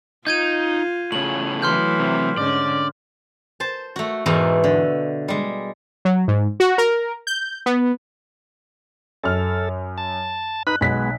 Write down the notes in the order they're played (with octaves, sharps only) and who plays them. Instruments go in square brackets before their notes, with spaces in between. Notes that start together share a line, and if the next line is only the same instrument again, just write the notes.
[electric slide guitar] D#4 [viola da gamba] F4 [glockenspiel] G6 G#6 D#7
[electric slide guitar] A2 C#3 [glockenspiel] F#7
[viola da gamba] E3 F#3 A3 [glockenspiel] C6 F6 G6
[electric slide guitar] C3
[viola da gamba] G#2 D3 C#4 [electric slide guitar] D5
[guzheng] C5 A5
A3 F#4
E2 G#2 B2 E3 A3 A#5
D3
G3 G#3
[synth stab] F#3
G#2
F#4
A#4
G6
B3
[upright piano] F#2 F6 [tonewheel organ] A4
[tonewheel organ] A5
[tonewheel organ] D#4 B4 B5 [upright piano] F#6
[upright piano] B1 B6 [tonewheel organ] G#3 B3